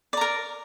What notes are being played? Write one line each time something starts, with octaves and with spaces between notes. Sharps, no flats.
A#4 D5 A#5